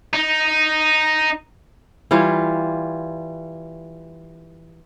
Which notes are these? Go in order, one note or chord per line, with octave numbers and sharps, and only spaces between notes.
D#4
E3 G3 F4 C#5